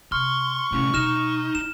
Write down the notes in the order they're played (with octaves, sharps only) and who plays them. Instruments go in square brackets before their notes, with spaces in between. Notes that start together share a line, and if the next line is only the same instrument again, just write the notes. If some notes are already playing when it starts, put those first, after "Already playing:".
[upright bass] C3 [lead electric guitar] C6 [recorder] C#6 [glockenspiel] F6
[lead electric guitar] A2 C#4 [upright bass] C3 G#3
[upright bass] B2 G#3 [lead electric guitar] D#4 [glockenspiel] F6 E7
[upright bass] C#4 [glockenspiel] E7